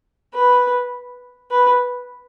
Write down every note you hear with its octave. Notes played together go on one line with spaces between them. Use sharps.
B4
B4